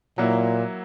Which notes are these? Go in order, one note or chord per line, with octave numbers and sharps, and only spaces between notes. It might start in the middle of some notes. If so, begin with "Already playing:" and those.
A#2 F#3 A#3 E4